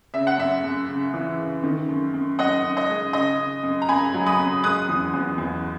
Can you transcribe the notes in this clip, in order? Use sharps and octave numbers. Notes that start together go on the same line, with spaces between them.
C#3 E5
F#5
F#2 E5
F#2
C#3
E3
C#3
D#3
F#2
F#2
F#2 D#5 F#5
F#2
D#5
G#3
C#3 D#5
C#3
F#2
A#5
F#2 G#5 B5
F#3
B5 D#6
F#2
G#3 D#6 F#6
E2
E2
E2